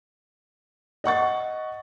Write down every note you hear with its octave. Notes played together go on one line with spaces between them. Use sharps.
D#5 F#5 C#6 A6